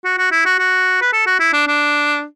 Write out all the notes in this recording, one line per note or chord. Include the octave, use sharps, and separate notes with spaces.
F#4
F#4
E4
F#4
F#4
B4
A4
F#4
E4
D4
D4